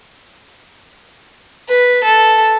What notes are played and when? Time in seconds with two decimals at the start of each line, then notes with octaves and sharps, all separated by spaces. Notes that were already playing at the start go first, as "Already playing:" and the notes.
1.69 B4
2.04 A4